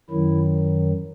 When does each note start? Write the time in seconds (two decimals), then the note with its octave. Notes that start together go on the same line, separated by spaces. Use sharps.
0.10 F#2 D#3 F#3 E4